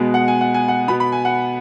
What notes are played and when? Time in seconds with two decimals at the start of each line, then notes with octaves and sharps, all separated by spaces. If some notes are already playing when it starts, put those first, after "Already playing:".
Already playing: B2 G#3 B3
0.14 F#5
0.28 G#5
0.41 F#5
0.54 G#5
0.68 F#5
0.88 B2 B3 B5
1.00 B5
1.12 G#5
1.25 F#5